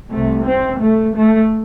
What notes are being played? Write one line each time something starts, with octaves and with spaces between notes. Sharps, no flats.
C2 C3 A3
C4
A3
A3